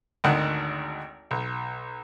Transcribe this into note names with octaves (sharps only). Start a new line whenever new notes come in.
G#1 D2 D#3 F#5 F#6
B1